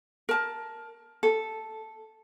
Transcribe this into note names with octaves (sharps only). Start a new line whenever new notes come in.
A#4 A5
A4